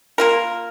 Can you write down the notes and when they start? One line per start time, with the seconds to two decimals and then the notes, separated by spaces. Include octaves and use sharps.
0.18 A#3 F4 A#4